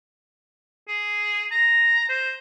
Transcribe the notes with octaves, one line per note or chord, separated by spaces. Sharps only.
G#4
A#5
C5